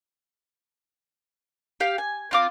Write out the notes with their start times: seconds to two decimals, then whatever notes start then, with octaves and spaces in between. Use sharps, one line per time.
1.80 G4 F5
1.98 G#5
2.31 C4 F4 D6